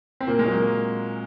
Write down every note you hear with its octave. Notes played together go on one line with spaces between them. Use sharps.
C4
A#2 A#3
G#3
F#3
A#3